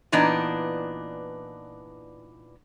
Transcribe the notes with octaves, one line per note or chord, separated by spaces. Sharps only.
A#2 E3 B3 D4 D#4